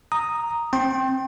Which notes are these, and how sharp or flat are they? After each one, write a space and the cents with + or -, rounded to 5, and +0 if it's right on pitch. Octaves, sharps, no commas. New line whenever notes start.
A#5 +0 D#6 +0
C4 +15 G5 -5 C6 +30